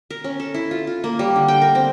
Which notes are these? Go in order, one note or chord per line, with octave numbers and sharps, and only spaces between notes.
A#4
C#4
A4
E4
F4
F4
A#3
G3
D3
G5
A#4
C4